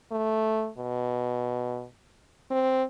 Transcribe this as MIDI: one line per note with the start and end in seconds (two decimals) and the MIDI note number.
0.12 0.69 57
0.78 1.85 47
2.50 2.83 60